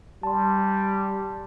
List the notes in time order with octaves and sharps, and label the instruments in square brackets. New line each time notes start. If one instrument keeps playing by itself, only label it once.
[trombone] G3 [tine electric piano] A5 C6